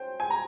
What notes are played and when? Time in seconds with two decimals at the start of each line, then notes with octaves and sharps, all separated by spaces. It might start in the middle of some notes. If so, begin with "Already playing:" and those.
Already playing: C#4 C5 G5
0.20 G#5
0.30 A#5